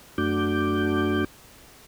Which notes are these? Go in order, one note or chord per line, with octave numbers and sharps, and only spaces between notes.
F#2 A3 D4 F#4 D6 G6